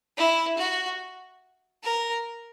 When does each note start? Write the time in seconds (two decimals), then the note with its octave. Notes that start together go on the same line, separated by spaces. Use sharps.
0.17 E4
0.58 F#4
1.83 A#4